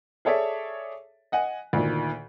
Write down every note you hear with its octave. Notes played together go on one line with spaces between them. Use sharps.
G#4 A4 C#5 D5 E5
D#5 F#5 G#5
D2 A#2 D#3